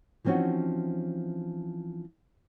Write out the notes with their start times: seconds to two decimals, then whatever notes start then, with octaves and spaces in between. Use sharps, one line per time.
0.24 E3 F3 C4 C#4 D#4 F#4